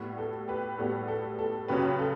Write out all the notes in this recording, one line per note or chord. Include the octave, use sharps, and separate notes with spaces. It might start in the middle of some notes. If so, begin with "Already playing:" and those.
Already playing: A2 G3 B3
A4
G4 B4
A2 G3 B3 A4
A4
A4
F#2 C#3 F#3 C#4 G4 B4
A4